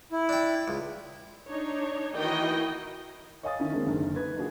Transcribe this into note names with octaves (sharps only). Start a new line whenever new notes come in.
E4
D4 G5
C#2
D4 D#4 C#5
D#3 E3 F#4 D#5 G5
C#5 D#5 F5 G#5 D#6 A6
D3 D#3 C#4 E4
C#3 G#3 A#3 C4 D4
F#1 D3 D#3
B4 G#6
A#3 D4 F4 F#4 G#4